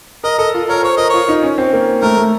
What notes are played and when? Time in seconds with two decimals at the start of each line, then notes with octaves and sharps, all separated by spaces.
0.24 A#4 D#5
0.39 A4 D#5
0.54 F4
0.69 A#4 C#5
0.83 C5 C#5
0.97 A#4 D#5
1.09 F4 C#5
1.29 D#4
1.43 C#4
1.58 C4
1.73 A#3
2.02 A3 A#4
2.17 A3